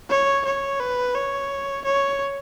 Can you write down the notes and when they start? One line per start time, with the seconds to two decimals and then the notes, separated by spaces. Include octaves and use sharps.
0.09 C#5
0.45 C#5
0.79 B4
1.15 C#5
1.85 C#5